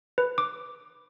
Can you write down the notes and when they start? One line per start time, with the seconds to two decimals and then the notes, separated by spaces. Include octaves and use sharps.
0.18 B4
0.38 D6